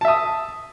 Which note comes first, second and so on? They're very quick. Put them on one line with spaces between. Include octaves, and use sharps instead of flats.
A5 E5 D#6